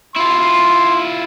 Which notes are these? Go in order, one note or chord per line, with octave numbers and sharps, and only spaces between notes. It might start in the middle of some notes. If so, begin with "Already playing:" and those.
E4 F4 C6